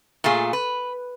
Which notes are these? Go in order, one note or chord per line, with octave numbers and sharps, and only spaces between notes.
A#2 A3 F4 G#4
B4